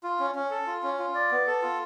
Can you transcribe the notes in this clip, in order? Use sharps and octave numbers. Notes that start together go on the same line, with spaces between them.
F4
C#4
C#4
A4
F4
C#4
F4
D5
B3
A4
F4